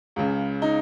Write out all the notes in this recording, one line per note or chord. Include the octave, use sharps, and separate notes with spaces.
C#2 C#3
D#4